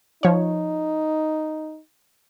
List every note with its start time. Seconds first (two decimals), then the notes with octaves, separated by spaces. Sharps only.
0.23 F3 D#4 C#5